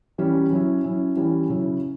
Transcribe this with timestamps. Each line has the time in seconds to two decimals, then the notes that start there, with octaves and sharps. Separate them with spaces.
0.18 E3 G3 C#4
0.51 F#3 C#4 E4
0.84 F#3 C#4 E4
1.16 E3 G3 C#4
1.50 C#3 F#3 C#4 E4